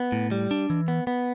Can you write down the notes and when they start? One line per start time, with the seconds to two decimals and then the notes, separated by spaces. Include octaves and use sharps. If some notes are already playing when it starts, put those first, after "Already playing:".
Already playing: B3
0.12 A2
0.31 G3
0.51 D4
0.70 E3
0.88 B3
1.07 B3